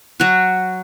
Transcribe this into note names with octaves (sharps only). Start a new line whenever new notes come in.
F#3 F#4